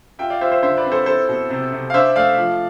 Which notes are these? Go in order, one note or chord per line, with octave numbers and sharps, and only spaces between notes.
F4 E5 G5
D5 F5
F4 C5 E5
C5 E5
D3 C5 E5
B4 D5
C4
A4 C5
E4 A4 C5
B2
C3
C3
F5
D4 C5 E5
A3 D5 F5
F3